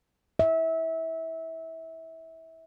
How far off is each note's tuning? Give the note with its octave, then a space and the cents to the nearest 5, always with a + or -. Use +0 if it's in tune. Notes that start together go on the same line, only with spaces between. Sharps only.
E5 -25